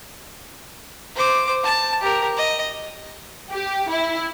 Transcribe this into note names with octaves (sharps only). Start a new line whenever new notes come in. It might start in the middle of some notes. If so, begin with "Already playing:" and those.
C5 D6
A5
G4 A#4
D#5
G4
E4